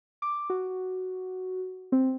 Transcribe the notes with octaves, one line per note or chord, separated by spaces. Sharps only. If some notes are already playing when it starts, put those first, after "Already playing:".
D6
F#4
C4